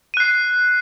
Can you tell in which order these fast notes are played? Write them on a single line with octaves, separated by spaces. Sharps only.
D#7 F#6 C7